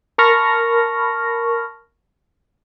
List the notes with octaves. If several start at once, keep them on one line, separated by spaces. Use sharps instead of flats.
A#4 A5 B5 C#6 F6 A#6